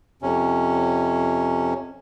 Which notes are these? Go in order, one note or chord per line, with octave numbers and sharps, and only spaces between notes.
F2 C3 C#4